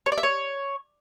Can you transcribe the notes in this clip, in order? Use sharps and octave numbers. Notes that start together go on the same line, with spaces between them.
C#5
D5
E5
C#5